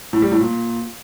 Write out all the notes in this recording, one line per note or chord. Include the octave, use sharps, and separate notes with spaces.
A2
G3
A2
A#2